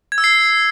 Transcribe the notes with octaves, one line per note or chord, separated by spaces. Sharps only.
G#6
E6
C7